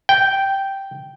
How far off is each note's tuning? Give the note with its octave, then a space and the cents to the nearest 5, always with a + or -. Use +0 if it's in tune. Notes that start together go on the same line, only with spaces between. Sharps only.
G5 -5